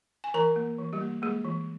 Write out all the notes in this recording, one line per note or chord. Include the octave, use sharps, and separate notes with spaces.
G#5
E3 A#4 A#5
A#3
E3
G3 G4
A#3
G#3 A#3 G#4
E3